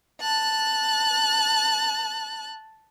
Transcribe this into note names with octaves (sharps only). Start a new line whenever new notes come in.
A5 F#6